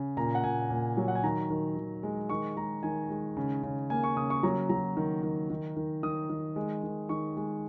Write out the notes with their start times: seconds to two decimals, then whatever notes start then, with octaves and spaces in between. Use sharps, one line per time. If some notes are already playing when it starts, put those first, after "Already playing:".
Already playing: C#3
0.17 A#2 A#5
0.35 F#5
0.44 A#2 G#5
0.70 A#2
0.97 F#3
1.08 F#5
1.15 G#5
1.23 D#3 A#5
1.50 D#3
1.77 D#3
2.03 G#3
2.30 D#3 C#6
2.57 G#3 A#5
2.83 D#3 G#5
3.10 G#3
3.37 C#3
3.63 C#3
3.90 A#3 G#5
4.04 C#6
4.17 C#3 D#6
4.30 C#6
4.43 F#3 A#5
4.69 F#3 A#5
4.97 D#3
5.23 D#3
5.50 D#3
5.77 D#3
6.03 D#3 D#6
6.30 D#3
6.56 G#3
6.83 D#3
7.09 D#3 C#6
7.37 G#3